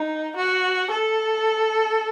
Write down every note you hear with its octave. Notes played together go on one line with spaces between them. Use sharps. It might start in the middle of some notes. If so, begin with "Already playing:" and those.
Already playing: D#4
F#4
A4